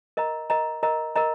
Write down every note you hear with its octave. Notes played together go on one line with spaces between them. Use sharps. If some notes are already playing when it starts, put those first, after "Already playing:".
A#4 D#5 A#5
A#4 D#5 A#5
A#4 D#5 A#5
A#4 D#5 A#5